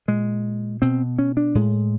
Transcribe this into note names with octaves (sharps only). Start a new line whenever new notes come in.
A#2 G#3
B2 C4
C#4
D4
A2 G#3